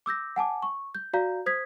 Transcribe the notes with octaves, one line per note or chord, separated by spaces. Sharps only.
D6 E6 G6 A#6
F#5 G#5 A5 D6
C#6
G6
F#4 D5 F5 A#5 G6
C5 D#6 G#6 B6